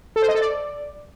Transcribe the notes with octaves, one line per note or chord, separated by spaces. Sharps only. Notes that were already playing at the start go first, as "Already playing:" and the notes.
A4
C5
D#5
A4
D5